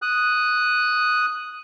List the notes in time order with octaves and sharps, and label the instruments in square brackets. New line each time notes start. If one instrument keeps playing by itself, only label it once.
[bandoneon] D#6 F#6